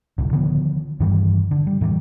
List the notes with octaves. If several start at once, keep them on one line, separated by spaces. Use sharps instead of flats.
D1 C2
D3 D#3 F3 B3
G2 D#3 E3 G3
D3
G3
A2 E3 F3 G3